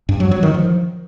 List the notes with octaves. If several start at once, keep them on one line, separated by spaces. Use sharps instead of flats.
G2
F#3
F#3
D#3
F3